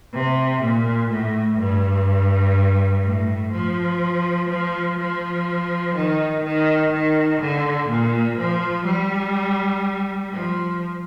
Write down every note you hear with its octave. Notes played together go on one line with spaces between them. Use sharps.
C3
A#2
A2
G2
A2
F3
F3
F3
D#3
D#3
D#3
D3
A#2
F3
G3
F3